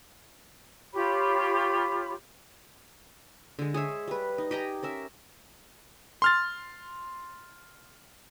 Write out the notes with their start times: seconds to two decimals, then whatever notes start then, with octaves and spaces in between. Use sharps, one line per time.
0.93 F4 G4 C#5 B5
3.59 D3 G#3
3.74 G#4 C#5 E5
4.08 G3 B4
4.38 D#4
4.51 G4 D#5 G#5 A#5
4.83 C#4 A#4 E5
6.22 C6 F6 A6